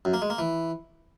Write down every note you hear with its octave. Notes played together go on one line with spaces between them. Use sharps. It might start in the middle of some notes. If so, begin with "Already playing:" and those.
F#2
A#3
G#3
A#3
E3